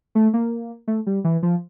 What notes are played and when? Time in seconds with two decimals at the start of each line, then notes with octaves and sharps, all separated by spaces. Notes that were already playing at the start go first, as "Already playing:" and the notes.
0.15 A3
0.34 A#3
0.88 A3
1.07 G3
1.24 E3
1.43 F3